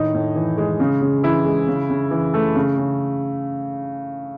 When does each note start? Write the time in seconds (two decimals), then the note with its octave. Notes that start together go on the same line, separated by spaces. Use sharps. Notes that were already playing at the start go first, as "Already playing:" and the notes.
Already playing: A2 D#3 D#4
0.14 A2
0.36 E3
0.58 G#3
0.80 C#3
1.01 C#3
1.23 E3 E4
1.45 G#3
1.67 C#3
1.90 C#3
2.11 E3
2.34 A3
2.55 C#3
2.78 C#3